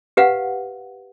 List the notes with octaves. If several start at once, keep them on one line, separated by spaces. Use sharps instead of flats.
G4 B4 F5 F#5